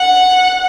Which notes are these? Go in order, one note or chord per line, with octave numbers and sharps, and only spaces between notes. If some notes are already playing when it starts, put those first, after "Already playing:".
Already playing: F#5